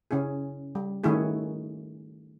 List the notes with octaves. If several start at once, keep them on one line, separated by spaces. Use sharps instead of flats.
C#3 C#4 E4 G#4
G3
D#3 A3 C#4 E4 F#4 G#4